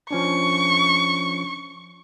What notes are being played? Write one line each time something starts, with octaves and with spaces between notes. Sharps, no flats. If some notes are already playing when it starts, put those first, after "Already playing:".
F3 C#4 D4 C#6